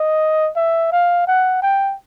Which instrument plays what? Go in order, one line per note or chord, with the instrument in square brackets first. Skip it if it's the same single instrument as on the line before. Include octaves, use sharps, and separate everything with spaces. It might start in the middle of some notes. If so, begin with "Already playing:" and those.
Already playing: [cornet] D#5
E5
F5
F#5
G5